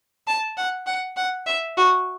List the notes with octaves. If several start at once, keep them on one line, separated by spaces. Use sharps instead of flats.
A5
F#5
F#5
F#5
E5
F#4